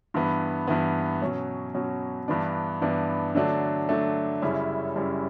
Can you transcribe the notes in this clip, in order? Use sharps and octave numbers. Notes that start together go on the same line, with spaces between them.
G2 E3 B3
G2 E3 B3
B2 F#3 C#4
B2 F#3 C#4
G2 E3 B3 D4
G2 E3 B3 D4
D3 F#3 A3 D4
D3 F#3 A3 D4
F#2 C#3 G3 C#4 E4
F#2 C#3 G3 C#4 E4